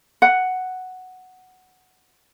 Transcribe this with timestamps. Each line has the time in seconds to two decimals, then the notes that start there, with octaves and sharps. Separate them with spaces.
0.22 F#5